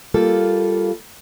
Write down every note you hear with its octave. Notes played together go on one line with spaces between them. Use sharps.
G3 A#3 F4 A4